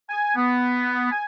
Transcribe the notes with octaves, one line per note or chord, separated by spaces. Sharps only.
G#5
B3
G#5